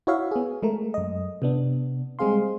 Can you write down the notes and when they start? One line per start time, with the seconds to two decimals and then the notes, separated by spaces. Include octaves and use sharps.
0.07 E4 F#4 C#5 E5 F5
0.31 B3 G#4
0.63 G#3 A3 A#4
0.94 F#2 D#5
1.42 C3 B3 D4
2.19 G3 G#3 C4 G#4 F5 C6